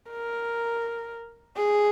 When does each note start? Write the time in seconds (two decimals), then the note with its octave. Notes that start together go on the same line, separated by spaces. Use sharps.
0.10 A#4
1.57 G#4